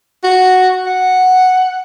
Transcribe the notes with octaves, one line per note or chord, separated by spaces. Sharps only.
F#4
F#5